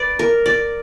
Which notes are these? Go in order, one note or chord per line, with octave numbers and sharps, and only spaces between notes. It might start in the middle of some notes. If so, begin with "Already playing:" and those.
Already playing: B4 D5
A#4
D5